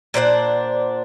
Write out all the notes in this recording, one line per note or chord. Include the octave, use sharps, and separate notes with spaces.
A#2 D4 C5 F#5